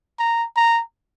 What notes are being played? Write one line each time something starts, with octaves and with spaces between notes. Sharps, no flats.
A#5
A#5